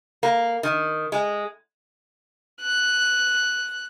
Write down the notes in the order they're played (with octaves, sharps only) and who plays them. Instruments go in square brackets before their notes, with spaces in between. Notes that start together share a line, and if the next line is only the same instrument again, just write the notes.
[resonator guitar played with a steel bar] A#3
D#3
G#3
[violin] F#6